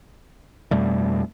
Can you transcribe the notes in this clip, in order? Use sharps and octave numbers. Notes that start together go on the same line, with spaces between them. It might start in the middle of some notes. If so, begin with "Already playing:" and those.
F2 B2 G3 A3